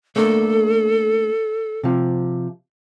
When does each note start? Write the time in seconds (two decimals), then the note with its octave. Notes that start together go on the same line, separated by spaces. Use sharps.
0.16 A3 A#3 D4 A4
1.83 C3 F3